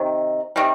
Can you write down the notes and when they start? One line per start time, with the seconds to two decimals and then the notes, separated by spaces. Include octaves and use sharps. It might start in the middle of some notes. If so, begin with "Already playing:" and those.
Already playing: C3 D#3
0.56 C3 D#3 G3